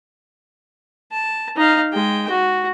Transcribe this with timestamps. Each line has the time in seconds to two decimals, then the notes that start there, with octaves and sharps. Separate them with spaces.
1.12 A5
1.57 D#4 F5
1.92 G#3 G5
2.29 F#4